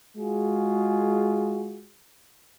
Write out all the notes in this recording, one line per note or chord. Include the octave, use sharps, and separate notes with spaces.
G#3 F4 F#4 G#4